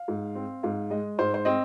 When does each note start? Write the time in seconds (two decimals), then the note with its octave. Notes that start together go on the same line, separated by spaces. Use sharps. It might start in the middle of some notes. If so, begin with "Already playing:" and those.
Already playing: F5
0.08 G#2
0.35 C4
0.63 G#2 F5
0.90 G#3 D#5
1.19 G#2 C5
1.34 C5
1.45 C4 D#5